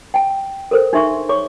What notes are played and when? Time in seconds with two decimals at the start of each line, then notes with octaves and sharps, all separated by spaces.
0.14 G5 A5
0.71 A4 A#4 C5
0.93 D4 D#4 G#4 E5 C6 C#6
1.29 G#4 C#5 C#6 D6